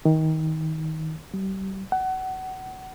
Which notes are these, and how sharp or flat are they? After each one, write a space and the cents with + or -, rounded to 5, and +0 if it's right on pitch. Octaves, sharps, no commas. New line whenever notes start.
D#3 +25
G3 -30
F#5 +25